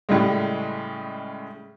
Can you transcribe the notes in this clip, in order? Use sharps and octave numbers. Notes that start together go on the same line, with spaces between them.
A2 C#3 G3 G#3